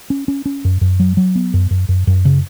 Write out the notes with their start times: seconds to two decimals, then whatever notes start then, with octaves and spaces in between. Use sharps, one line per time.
0.10 C#4
0.28 C#4
0.46 C#4
0.65 F#2
0.81 F#2
1.00 F#3
1.17 F#3
1.35 B3
1.54 F#2
1.71 F#2
1.89 F#2
2.07 F#2
2.25 C#3